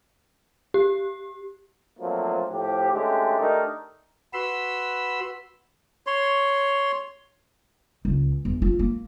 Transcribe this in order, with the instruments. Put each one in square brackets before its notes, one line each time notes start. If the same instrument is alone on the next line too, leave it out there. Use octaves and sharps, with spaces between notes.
[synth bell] G4
[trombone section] F3 F#3 A3 A#3 C4 D4
A2 F3 G4
D3 G#3 A3 C#4 D#4 G4
A3 D4 D#4 G4 A#4
[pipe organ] F#4 B4 B5 C6 E6
[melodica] C#5 C6
[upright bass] C#2
E2
F4
A#3